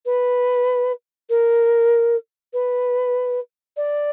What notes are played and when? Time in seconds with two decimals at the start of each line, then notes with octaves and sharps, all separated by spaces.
0.05 B4
1.29 A#4
2.53 B4
3.77 D5